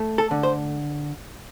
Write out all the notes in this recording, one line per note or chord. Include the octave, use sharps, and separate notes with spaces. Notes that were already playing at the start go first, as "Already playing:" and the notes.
Already playing: A3
A4
D3
C5